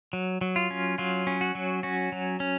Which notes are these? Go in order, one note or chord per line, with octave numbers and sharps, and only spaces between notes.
F#3
F#3
F4
C#4
F#3 F4
C#4
F#4
F#3
C#4 F#4
F#3
C#4